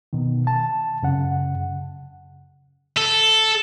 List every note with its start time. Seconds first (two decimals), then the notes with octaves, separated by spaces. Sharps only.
0.13 B2 D#3
0.47 A5
1.03 F#2 C#3 F#5
2.97 A4